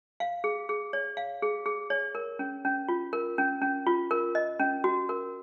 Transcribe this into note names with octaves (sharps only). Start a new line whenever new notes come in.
F5
G#4
G#4
C#5
F5
G#4
G#4
C#5
A#4
C#4
C#4
F4
A#4
C#4
C#4
F4
A#4
D#5
C#4
F#4
A#4